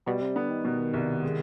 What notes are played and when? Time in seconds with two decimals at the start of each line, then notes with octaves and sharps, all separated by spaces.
0.06 B2 G3
0.21 C3
0.35 D3 B3
0.50 D#3
0.65 B2
0.94 C2
1.23 G#3